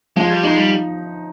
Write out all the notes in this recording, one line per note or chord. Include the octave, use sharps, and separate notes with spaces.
F3 G#3
G3
G#3 D#4
G3